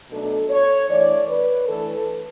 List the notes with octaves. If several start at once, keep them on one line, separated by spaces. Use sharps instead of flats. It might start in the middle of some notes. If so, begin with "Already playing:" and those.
B2 F#3 A3 D4 A4
C#5
E3 A3 D4 D5
B4
E3 A3 D4 A4